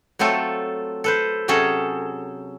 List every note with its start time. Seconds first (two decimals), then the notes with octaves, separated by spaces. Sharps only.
0.19 F#3 A3 C4 F4 A4
1.04 A4 B4 C5
1.48 C3 F#3 C#4 G#4 A4